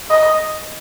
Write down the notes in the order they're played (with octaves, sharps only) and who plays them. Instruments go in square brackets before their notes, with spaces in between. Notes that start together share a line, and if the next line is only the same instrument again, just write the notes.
[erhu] D#5